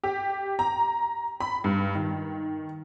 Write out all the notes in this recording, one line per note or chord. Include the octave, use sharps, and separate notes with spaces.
G4
A#5
B5
G2
D#3